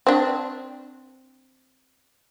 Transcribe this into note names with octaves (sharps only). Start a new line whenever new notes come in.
C4 D4